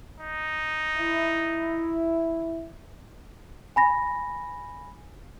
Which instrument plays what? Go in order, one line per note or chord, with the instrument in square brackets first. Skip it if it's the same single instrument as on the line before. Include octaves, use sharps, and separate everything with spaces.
[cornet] D#4
[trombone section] E4
[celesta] G#5 B5 A#6